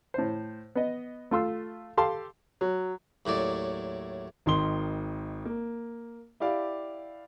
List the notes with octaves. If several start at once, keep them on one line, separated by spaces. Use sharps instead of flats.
A2 C5
B3 D#5
A3 F4 C6 E6
G4 A4 F5 A5 C6
F#3
D#2 A2 F#3 D5
G#1 D#3 C6 G7
A#3
E4 G4 D5 F5